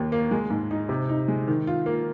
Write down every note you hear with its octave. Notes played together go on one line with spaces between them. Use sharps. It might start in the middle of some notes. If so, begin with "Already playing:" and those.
Already playing: D#2 D#3
A#3
G#3
G#2
D#4
C3
D#4
G#3
D#3
F4
A#3